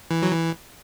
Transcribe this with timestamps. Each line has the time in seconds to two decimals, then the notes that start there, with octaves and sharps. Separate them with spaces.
0.11 E3
0.23 F#3
0.32 E3